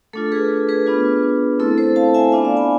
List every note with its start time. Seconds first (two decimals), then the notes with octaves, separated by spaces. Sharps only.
0.13 A3 D4 F4 A4
0.32 G#4 B4
0.69 G#4 B4
0.87 B3 D4 F4
1.59 A3 C4 E4 A4
1.78 A4 C5
1.96 F5 A5
2.14 E5 G#5
2.32 B3 D4 F4 E5 G#5
2.45 D5 F5
2.57 G#5 B5